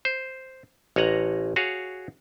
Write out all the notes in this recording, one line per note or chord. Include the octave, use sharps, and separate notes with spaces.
C5
A1 C#5 D#5 F#5 A#5
F#4 G#4 C#5 F5